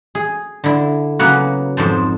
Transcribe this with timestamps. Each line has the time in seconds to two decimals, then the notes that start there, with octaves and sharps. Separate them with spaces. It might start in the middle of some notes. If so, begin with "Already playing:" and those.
0.15 G#4
0.64 D3 E4
1.19 C#3 F#3 A#3 B3 F#4
1.77 F2 G#2 C5 A5